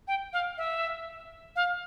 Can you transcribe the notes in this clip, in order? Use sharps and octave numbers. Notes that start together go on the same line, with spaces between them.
G5
F5
E5
F5